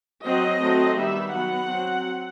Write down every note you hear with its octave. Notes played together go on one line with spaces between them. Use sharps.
F#3 C4 D#5
F#3 A3 C4
D#3 G3 B3 E5
F#3 B3 F#5
F#3 C4